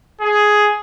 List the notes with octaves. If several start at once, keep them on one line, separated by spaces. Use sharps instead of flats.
G#4